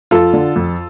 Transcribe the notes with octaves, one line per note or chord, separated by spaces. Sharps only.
F2 F4 A4
D3
F2